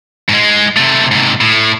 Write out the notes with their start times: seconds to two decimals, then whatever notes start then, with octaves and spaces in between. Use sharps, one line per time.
0.29 G#2 G#3
0.77 C3 A3
1.12 G#2 C3
1.41 A2